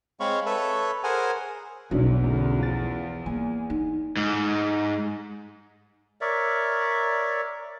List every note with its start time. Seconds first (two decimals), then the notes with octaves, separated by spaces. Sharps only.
0.20 G#3 C4 C#5 F5 B5 C#6
0.46 A4 B4 C#5 E5
1.04 G#4 A#4 C5 F#5 G#5
1.91 B1 E2 E3 F#3 D4 E4
2.24 F#2 D3
2.58 F3 A6
3.26 A#3 G#5
3.70 D#4
4.17 G#2
6.21 A#4 C#5 D5 E5